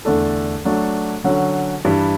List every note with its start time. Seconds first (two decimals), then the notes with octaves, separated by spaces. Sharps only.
0.05 E2 D3 A3 D4 A4
0.65 F#3 A3 D4
1.24 D3 F#3 C#4
1.85 G2 E3 G3